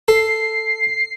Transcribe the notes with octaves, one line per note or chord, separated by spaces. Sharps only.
A4 C7